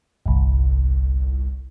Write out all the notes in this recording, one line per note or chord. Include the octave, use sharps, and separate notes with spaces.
G1 C2